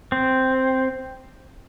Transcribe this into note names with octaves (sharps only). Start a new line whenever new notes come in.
C4